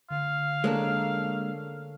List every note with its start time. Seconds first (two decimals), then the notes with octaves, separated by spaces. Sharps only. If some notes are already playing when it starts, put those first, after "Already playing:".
0.11 D3 F5
0.64 G#3 A#3 D4 A4 A#4 C#5